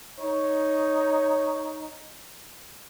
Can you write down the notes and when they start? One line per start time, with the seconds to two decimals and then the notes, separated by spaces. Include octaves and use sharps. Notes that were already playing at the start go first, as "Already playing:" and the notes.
0.20 D#4 C#5